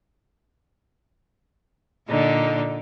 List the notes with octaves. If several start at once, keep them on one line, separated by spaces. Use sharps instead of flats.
A#2 D3 D#4